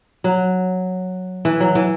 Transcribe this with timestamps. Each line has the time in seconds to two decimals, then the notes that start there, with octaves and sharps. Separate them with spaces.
0.24 F#3
1.45 E3
1.60 F#3
1.75 E3